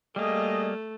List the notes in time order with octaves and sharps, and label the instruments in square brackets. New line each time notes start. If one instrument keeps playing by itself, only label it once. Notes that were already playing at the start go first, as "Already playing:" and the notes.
[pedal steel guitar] G3 A#3 [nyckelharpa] A3 [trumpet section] G#4 D#5